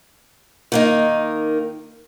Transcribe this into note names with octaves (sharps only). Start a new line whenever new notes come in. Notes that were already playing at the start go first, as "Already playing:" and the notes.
D#3 A#3 D#4